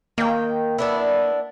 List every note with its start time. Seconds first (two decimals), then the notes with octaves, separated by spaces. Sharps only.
0.18 D#3 A#3 G5
0.78 B3 D4 E4